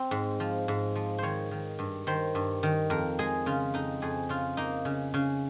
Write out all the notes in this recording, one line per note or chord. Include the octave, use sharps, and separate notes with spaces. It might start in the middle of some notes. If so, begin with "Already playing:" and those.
Already playing: C4
G#2
F3
G#2
F3
D#3 C5 C#5
D#3
G2
D#3 C5
G2
D#3
F2 A#4
G#3 G#4
C#3 F4
F2 D#4
F2 G#4
C#3 F4
A#3 D#4
C#3
C#3